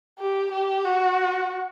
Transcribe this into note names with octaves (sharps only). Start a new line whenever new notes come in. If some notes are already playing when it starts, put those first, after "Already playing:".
G4
G4
F#4